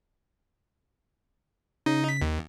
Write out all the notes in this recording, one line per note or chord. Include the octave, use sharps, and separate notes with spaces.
C#3 D#4
B6
D#2